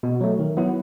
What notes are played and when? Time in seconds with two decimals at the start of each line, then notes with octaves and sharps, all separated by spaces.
0.03 B2
0.21 F#3 A3
0.39 D#3
0.57 F#3 B3 E4